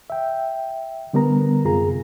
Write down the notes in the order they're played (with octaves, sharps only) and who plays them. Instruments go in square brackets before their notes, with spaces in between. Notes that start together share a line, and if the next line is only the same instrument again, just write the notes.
[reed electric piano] E5 G5
D3 G3 B3 A#4 A#5
F#2 C3 F4 G#4 A#5